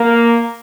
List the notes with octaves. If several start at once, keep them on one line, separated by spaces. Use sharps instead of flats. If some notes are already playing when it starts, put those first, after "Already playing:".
Already playing: A#3